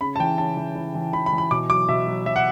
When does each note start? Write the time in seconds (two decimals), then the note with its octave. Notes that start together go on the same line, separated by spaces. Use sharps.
0.01 C#3 B5
0.16 A5
0.20 E3 G5
0.38 C#3 A5
0.57 E3
0.75 E3
0.95 E3
1.13 E3 B5
1.26 B5
1.33 E3
1.38 B5
1.51 B2 D6
1.70 F#3 D6
1.89 B2 E5
2.07 F#3
2.26 F#3 E5
2.36 F#5